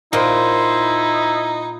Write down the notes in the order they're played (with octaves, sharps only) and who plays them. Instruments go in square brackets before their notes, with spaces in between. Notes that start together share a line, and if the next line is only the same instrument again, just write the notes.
[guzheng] A#2 [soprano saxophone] D#4 [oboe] E4 [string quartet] C5